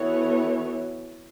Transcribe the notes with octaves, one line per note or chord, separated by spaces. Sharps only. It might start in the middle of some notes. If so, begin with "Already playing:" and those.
Already playing: E3 B3 F#4 A4 C#5